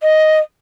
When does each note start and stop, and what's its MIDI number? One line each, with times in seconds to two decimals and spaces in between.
0.01 0.39 75